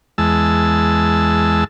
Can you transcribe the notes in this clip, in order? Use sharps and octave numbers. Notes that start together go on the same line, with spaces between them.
E2 G#3 A5 E6